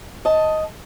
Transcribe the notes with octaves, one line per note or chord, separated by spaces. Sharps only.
D#5 A5